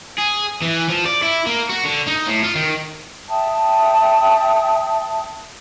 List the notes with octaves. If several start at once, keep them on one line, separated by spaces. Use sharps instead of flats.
G#4
E3
F3
D5
E4
A#3
F#4
D3
D#4
A2
F4
D#3
E5 G5 A5 D#6